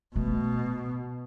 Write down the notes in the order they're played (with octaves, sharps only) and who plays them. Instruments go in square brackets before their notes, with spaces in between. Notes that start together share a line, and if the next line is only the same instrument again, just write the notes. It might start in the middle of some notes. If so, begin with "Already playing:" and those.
[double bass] B2 [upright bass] A3